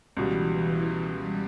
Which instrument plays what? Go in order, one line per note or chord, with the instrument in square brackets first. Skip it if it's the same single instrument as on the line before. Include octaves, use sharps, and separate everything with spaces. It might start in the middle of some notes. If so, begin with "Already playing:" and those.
[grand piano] C#2 B2 G3 [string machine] E3
[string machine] G3